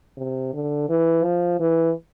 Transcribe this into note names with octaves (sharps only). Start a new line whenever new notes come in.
C3
D3
E3
F3
E3